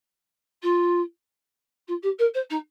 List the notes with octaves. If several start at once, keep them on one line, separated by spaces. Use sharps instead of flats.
F4
F4
G4
A#4
C5
D#4